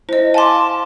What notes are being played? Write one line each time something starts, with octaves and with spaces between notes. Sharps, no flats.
E4 C5 D#5
F5 G#5 A5 C6 D6